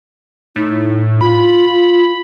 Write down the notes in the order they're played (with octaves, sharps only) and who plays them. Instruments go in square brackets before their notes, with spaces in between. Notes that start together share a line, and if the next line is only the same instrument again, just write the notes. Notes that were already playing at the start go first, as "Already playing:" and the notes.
[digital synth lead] A2 [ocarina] D#4
[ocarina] F4 [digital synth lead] B5